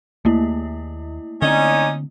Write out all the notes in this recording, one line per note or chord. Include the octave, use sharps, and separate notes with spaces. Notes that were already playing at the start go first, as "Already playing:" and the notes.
D#2 A3 A#3 E4
D3 C4 C#4 D#4 D5